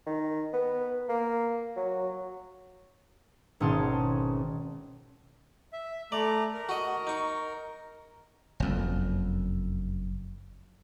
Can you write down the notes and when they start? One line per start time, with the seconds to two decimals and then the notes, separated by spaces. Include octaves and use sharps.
0.06 D#3
0.53 B3
1.09 A#3
1.76 F#3
3.60 G#1 B2 C#4 G#4 A5 C6
5.73 E5
6.12 A3 D5 A#5
6.54 A#4
6.69 F#4 D#5
7.07 D#4 C#6
8.60 F#1 F2